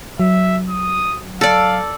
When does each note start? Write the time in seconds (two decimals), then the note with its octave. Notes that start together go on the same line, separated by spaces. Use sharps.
0.20 F#3 E5
0.70 D#6
1.41 A4 D5 F5